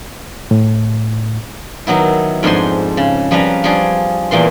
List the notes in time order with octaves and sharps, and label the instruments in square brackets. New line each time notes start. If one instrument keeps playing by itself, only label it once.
[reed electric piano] A2
[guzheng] D#3 F#3 B3 E4
F2 G#2 D4 C5 G#5 C6
C#3
F3 G3 C#4 B4 A#5
F3 G3 D4 G#4
E2 A#2 E3 C6